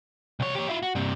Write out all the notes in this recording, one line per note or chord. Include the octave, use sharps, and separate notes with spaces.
C2 C#5
G4 C#5
E4 F4
F#4
G2 C3